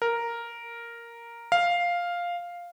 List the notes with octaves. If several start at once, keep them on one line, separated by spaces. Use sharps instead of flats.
A#4
F5